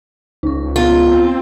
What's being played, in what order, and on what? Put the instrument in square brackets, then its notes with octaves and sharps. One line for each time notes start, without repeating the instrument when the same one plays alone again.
[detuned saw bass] C#2 [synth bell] D#4 C#6
[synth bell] B3 [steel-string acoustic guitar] F4
[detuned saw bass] C4